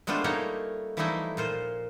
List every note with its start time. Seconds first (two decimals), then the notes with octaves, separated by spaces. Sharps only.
0.07 G#3 A3 B3 D4 F4 C5
0.24 G3 A3 A#3 D#4 C#5
0.97 E3 F3 G3 A3 D#4 E4
1.37 A#2 F4 C5